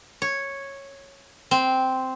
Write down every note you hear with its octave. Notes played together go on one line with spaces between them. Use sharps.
C#5
C4